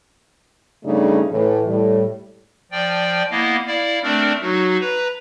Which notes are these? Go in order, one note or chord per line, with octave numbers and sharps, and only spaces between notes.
G2 C#3 G3 A3 D4 D#4
A2 E3
A2 G3
F3 D5 G5
A#3 B3 E4 D#5 F5
E4 D5 F5
A3 C4 D4 A#4 D5
F#3 D#4 F#4
B4 A#5